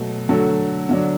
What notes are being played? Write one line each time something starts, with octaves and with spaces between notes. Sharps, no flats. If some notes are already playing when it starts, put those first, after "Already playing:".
Already playing: B2 F#3 A3
D3 F#3 A3 F#4 A4
D3 F#3 D4